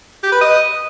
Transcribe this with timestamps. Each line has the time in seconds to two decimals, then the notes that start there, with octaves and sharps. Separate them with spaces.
0.23 G4
0.32 B4
0.41 D#5